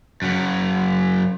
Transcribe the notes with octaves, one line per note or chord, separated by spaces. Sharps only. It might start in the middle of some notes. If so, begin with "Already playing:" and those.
F#2 C#3